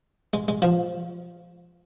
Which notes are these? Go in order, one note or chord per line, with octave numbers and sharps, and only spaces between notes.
G#3
G#3
F3